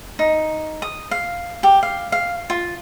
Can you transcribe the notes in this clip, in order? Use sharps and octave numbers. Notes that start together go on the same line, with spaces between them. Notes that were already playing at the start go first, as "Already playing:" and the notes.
D#4
D#6
F5
G4
F5
F5
F4